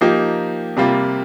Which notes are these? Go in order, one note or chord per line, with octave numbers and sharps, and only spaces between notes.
F3 A#3 D#4 G4
C3 G3 A#3 F4